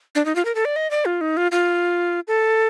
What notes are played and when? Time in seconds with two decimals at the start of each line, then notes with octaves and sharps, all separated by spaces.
0.15 D4
0.25 D#4
0.36 F4
0.45 A#4
0.55 A4
0.65 D5
0.76 D#5
0.91 D5
1.05 F4
1.21 D#4
1.37 F4
1.52 F4
2.28 A4